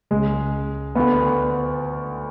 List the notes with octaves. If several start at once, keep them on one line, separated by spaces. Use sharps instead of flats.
C#2 C#3 G#3
D2 D3 B3